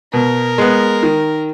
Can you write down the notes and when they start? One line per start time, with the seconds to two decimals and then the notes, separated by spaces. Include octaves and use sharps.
0.13 B2 A#4
0.58 G#3 B3
1.03 D#3